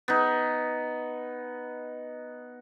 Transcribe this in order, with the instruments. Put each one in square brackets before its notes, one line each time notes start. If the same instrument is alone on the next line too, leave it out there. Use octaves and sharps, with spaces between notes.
[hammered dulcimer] B3 D#4